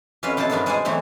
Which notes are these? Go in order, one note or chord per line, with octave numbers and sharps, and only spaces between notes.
F2 C#4 F4 B4 E5 F5
F2 B2 E4 C5 E5 A5
G2 D#3 F#3 B3 D4 F4
G3 G#3 C5 D5 F#5 G#5
B2 E3 F#3 A3 C4